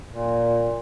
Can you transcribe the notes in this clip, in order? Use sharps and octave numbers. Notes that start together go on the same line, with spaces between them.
A#2